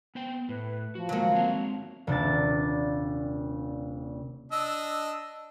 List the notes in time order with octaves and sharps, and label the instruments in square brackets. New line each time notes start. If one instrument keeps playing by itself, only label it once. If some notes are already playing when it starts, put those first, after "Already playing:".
[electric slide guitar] B3 C5 G5
[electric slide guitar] A2 [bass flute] B4
[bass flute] F3 [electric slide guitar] F#4
[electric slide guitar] D#3 G#3 [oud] F#3 A#3
[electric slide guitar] G#3 C4 F5
[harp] D#1 C3 D4 A6
[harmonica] D4 D#5 E6